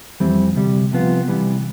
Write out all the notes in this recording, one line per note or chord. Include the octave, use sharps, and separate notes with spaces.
F2 E3 G3 C4
D2 C3 G3
C2 C3 F3 B3 F4
C3 E3 G3